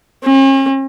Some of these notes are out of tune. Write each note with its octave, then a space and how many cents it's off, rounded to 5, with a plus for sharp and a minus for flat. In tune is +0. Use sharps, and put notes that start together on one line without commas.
C#4 -45